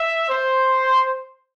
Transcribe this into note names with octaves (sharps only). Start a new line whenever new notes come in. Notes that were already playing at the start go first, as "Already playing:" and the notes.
Already playing: E5
C5